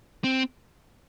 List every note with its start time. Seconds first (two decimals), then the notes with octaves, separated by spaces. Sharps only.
0.24 C4